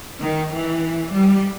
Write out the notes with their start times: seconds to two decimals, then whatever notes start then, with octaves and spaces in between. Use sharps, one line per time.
0.20 D#3
0.50 E3
1.10 G3